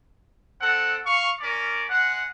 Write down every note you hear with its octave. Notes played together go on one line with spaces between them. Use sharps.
C4 A4 F#5
F5 C#6
C#4 A#4 D5
G#3 F#5